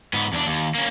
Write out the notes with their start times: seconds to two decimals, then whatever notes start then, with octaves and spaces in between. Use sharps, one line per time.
0.13 G#2 B3
0.33 E2 D4
0.46 D#2
0.75 A#3 C#4